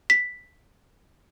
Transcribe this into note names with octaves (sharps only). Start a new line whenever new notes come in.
B6